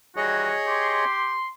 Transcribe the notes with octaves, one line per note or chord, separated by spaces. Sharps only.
D#3 E3 G3 F#4 G#4 C#5 D#5
G4 C6